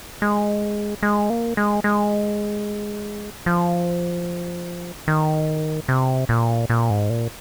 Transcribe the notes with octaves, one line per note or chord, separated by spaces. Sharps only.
G#3
G#3
A#3
G#3
G#3
F3
D#3
C3
A#2
A#2
G#2
A#2